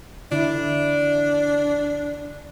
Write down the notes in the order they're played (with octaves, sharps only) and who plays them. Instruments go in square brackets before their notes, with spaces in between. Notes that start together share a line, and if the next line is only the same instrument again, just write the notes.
[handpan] D3 E4 [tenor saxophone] D4